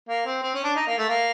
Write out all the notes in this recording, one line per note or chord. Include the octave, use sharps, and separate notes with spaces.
A#3
C4
C4
C#4
D4
D#4
A#3
A3
A#3